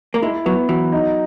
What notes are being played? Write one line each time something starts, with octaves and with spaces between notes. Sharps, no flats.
A#3
G#3 E4
F#3 B3
E3 F#3
D#4